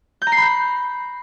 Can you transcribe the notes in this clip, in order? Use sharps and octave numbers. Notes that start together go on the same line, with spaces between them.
G6
A#5
C7
B5
G6